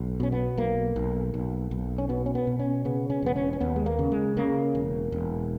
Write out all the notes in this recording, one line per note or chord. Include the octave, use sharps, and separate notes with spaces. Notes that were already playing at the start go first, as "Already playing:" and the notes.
Already playing: B1
B2 C#4
B3
B1 A#3
B1
B1
B1
C#4
B2 B3
C#4
B3
B2
C#4
C#3 B3
C#4
E1 B3
C#4
C#4
D#2 B3
G#3
A#3
C#3
G#3
C#3 A#3
E1
E1